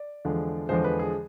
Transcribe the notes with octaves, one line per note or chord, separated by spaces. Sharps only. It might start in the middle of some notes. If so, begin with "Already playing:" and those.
Already playing: D5
E2 D3 F3 G#3
E2 D3 F3 G#3 C5
B4
G#4